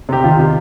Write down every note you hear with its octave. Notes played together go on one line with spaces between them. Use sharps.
C3 G4
D#3 F4
C3